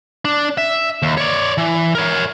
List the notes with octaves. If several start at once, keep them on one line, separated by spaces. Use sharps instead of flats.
D4
E5
D#2
C#5 D5
E3
A#4 C#5